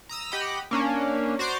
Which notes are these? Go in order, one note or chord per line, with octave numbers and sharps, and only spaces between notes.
A#5 D#6 E6
G4 D#5 F#5 B5
A#3 C#4 D4
F#4 C5 D5 A#5 C6 D6